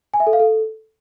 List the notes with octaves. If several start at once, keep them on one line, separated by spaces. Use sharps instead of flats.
G#5
E5
A4
F5
A4